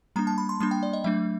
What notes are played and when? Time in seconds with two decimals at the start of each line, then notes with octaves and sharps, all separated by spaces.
0.16 G3 A#3 D4 A#5
0.27 A5
0.38 B5
0.49 C6
0.60 G3 A#3 D4 C6
0.71 G5
0.83 D5
0.93 D#5
1.04 F#3 A3 D4 E5